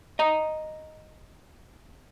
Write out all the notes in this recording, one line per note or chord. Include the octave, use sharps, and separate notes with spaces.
D#5 A#5